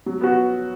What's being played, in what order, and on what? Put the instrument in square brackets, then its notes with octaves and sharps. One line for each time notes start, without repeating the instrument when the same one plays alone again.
[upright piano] F#3
B3 F#4